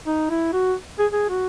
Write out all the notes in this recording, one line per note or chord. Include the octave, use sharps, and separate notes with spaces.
D#4
E4
F#4
G#4
G#4
F#4